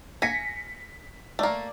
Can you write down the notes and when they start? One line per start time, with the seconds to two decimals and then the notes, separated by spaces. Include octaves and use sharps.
0.22 G#5 A#6 B6 C#7
1.39 A3 A#3 D5